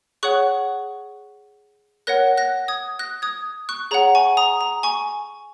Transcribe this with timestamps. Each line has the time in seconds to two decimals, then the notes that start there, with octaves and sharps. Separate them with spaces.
0.23 G#4 C#5 F#5 C#6 F#6
2.07 A#4 C#5 F#5 F#6 A#6
2.37 F#6 A#6
2.68 D#6 G#6
2.99 F#6 A#6
3.22 D#6 G#6
3.69 C#6 F#6
3.91 G#4 C#5 F#5 A#5
4.15 G#5 C#6
4.37 A#5 D#6
4.61 A#5
4.83 G#5 C#6